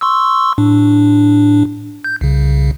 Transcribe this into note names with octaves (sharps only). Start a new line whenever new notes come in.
C6 C#6 E6
A2 D4
G6
C2 C#3